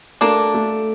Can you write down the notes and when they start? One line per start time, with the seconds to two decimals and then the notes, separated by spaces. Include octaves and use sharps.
0.21 A3 A#3 D4
0.54 A3